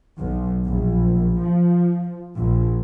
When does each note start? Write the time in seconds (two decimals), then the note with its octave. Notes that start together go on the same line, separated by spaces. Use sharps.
0.20 B1
0.64 A#1
1.38 F3
2.35 A#1